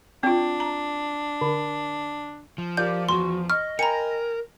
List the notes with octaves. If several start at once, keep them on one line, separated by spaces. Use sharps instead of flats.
C4 D4 F4
A#5
D3
F3
F4 G4 A#4 D5 G6
E2 F#4 C6
D#5 C#6 F6
A#4 G5 G#5 A#5 B5 C#7